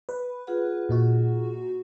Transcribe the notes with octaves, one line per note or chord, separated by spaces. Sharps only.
B4
F4 G#4 F#5
A#2 D#4 F#4